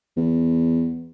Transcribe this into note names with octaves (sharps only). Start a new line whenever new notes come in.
E2